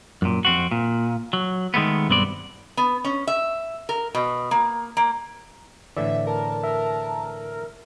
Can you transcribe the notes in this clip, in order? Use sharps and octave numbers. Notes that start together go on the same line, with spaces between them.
F#2 A#2
F2 C4 F#4
A#2
F#3
D#3 G#3 A3 B3
B1 G2 B3 C4 D5
B3
C#4
E5
A#4
B2
A#3
A#3
A2 D3 E3 D5 E5
A#4 A5
A#4 E5 E6